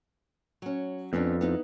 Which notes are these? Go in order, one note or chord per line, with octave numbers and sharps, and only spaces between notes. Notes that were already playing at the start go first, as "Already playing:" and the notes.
F#3 C#4
F2 B3 C#4 D4
B3 D#4 E4